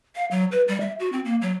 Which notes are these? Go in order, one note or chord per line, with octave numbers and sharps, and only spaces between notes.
F5
F#3
B4
G3
E5
F#4
C4
A#3
F#3